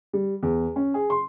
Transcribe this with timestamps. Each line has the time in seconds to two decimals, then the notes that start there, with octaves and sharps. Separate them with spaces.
0.13 G3
0.43 E2
0.76 C#4
0.94 G#4
1.10 C6